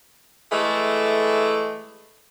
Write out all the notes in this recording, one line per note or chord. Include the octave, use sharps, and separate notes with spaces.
E3 G#3 A3